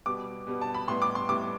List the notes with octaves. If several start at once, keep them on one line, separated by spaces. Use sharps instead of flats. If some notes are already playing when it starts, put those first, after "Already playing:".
B2 G3 B3 D6
B2 G3 B3
A5
B5
A2 G3 B3 C6
D6
C6
A2 G3 B3 D6